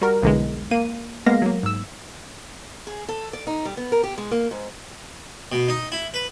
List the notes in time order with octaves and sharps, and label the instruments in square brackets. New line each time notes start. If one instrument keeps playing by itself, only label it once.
[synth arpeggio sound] G3 F#4 A#4
B1 E2 D3 E3 G#3
A#3 D#7
G#3 A#3 B3 F5 A#6
F#3 A#3
G#2 E6
[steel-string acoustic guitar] G#4
A4
D5
D#4
G3
B3
A#4
G4
G#3
A#3
G#2
[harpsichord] B2
D#4
E4
B4